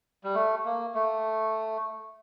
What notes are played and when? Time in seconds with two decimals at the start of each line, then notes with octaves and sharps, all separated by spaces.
0.24 G3
0.34 A3
0.65 A#3
0.95 A3